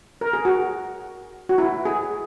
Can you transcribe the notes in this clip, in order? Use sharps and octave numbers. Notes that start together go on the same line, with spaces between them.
A#4
G#4
F#4
F#4
E4
G#4